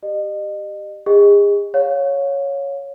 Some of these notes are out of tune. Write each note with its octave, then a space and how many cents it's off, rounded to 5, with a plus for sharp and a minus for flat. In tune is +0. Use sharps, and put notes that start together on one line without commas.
G4 +0 D#5 -35
G#4 -35 D#5 +5
C#5 +0 F5 +25